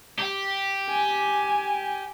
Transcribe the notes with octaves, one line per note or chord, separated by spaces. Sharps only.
G4
G#5